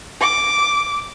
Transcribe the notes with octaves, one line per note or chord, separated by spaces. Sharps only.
D6